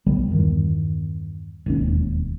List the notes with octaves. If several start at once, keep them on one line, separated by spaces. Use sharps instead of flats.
B1 D3 G3 B3
E2 G2 D#3
E1 D#2 C#4